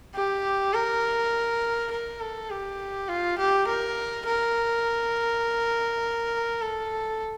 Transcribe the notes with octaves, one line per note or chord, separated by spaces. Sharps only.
G4
A#4
A#4
A4
G4
F4
G4
A#4
A#4
A4